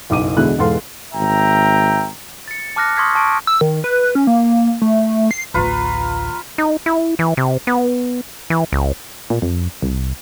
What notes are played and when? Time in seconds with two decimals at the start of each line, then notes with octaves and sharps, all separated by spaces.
0.10 F#1 B1 D6 D#7
0.37 E2 B2 D3 G#3 E4 F#6
0.58 E1 E2 G#2 A4 F5 C6
1.13 G#1 E5 G5 A#5
2.48 A6 C#7
2.76 A5 D6 F6 F#6 A#6 C#7
2.97 C6 C#6 D#6 F6 G#6 B6
3.15 A5 C#6 D7
3.47 E6
3.61 D#3
3.84 B4
4.15 C#4
4.27 A#3
4.82 A3
5.31 C7
5.54 A1 D2 F4 B4 A#5
6.58 D#4
6.86 E4
7.19 E3
7.37 C3
7.67 B3
8.50 E3
8.73 C#2
9.30 A#2
9.42 F2
9.82 C2